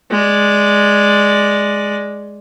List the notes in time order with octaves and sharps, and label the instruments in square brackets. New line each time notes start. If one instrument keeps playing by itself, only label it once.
[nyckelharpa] G#3 D5